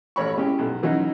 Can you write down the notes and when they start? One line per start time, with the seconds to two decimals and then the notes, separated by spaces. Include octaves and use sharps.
0.16 A1 C#5 B5 C#6
0.37 G#3 C#4 E4 G4
0.59 B1
0.83 E3 F#3 C#4 D#4